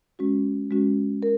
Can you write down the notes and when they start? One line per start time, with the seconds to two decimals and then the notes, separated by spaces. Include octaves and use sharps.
0.19 G#3 C#4 F#4
0.71 G#3 C#4 F#4
1.23 A#4